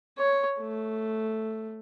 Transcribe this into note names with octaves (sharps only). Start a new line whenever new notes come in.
C#5
A3